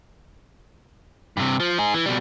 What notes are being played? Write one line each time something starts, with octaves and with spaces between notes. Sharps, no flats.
G2 C3
F3
D#4 G#4
E3
B2 G3